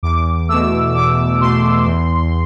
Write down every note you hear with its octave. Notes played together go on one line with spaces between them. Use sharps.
E2 D6
B2 A3 E6
E2 D6
B2 A3 C6
E2